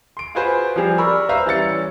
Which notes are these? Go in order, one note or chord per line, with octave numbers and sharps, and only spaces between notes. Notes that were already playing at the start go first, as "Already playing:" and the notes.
C6 D7
F4 F#4 G#4 B4 C5
F3 G3 C4 G4 G#4 C5
A#4 D5 B5 C#6 E6
B4 C5 E5 F5 A#5
E3 G3 C#4 A6 C#7